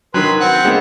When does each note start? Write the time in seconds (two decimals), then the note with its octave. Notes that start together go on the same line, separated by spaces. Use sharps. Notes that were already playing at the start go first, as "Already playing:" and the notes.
0.14 D#3 F#3 B4 C6
0.40 C4 F#5
0.64 G#3 A#3 B3